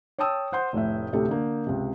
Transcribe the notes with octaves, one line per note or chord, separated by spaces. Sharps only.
C#5 G5 A5 D#6 E6
C5 F#5 C6 G6
F1 A2 E5
D2 A2 C3 G4 A4
D3 A#3
C#2 C3